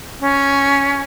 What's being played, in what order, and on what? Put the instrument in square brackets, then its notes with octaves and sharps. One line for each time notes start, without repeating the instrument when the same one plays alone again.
[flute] C#4